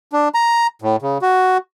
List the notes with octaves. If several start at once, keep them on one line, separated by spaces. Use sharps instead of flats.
D4
A#5
A2
C#3
F#4